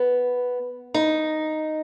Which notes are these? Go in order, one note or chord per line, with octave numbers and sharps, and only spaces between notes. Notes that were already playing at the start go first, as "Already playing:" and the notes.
Already playing: B3
D#4